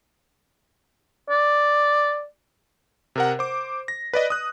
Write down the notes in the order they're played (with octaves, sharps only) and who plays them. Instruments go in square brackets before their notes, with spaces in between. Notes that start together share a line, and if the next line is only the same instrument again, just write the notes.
[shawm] D5
[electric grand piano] C3 A#4 F#5
C5 D6
A#6
B4 D5 D#5
D#6 F#6